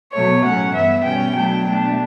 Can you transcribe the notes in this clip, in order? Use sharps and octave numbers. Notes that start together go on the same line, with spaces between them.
B2 F#3 A3 C#5
A2 F#3 C#4 F#5
G2 E3 B3 E5
B2 G3 C#4 G5
B2 F#3 A3 D4 G5
B2 A3 D4